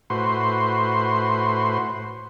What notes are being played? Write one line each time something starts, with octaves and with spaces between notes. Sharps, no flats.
A2 F#4 B4 C5 C6